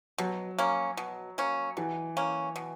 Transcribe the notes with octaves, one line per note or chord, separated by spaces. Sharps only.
B2 F#3
A#3 C#4
B2
A#3 C#4
B2 E3
A#3 C#4
B2